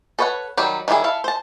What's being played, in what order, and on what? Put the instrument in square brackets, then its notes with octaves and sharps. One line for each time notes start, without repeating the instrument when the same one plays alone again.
[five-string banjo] A4 B4 C#5 D#5 F#5
D#3 F#3 G3 G4
D#3 G3 E4 F4 G#4
E4 A4 F5
C5 A5